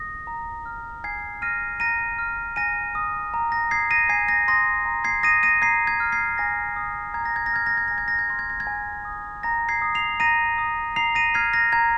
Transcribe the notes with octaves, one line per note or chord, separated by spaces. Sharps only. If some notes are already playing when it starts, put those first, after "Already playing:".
Already playing: D#6 A#6
A#5
F6
G#5 G#6 C7
F6 A#6 D#7
A#5 A#6 D#7
F6
G#5 A#6 D#7
D#6
A#5
A#6
D#6 G#6 C7
A#6 D#7
G#5 G#6 C7
A#6
C6 D#6 A#6
A#5
G#6 C7
D#6 A#6 D#7
A#6 D#7
A#5 G#6 C7
G#6
F6
G#6 C7
G#5 A#6
D#6
A#5 G#6
A#6
G#6
A#6
F6 G#6
A#6
G#6
G#5 A#6
G#6
A#6
G#6
C6 F6 A#6
G#6
A#6
G#6
G#5
D#6
A#5 A#6
G#6 C7
D#6
C7 F7
A#5 A#6 D#7
D#6
A#5 C7 F7
A#6 D#7
F6 G#6 C7
A#6
A#5 G#6